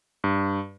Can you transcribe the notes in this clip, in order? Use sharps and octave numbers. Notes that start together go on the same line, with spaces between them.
G2